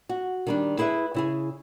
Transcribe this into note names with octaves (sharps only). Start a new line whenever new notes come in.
F#4
D#3 G3 D4
E4 G#4 B4 E5
C#3 E4 G#4